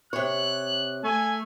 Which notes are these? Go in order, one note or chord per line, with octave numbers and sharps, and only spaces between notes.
C3 C#5 F#6
A3 G#5